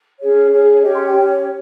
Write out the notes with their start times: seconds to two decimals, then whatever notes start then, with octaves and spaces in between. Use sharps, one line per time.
0.19 C#4 G#4 C#5
0.51 C#4 G#4 C#5
0.72 C#5
0.83 C#4 G4 C#5 D#5
0.94 C6
1.04 G5
1.14 C#4 G4 C#5